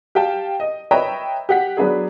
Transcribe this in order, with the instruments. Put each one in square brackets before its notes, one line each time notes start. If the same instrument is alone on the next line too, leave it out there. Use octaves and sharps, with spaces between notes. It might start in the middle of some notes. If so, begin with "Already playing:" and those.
[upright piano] G4 F5 G5 A5
D#5
B4 C#5 D#5 E5 G5 A#5
G4 F#5 B6
F#3 B3 D4 G#4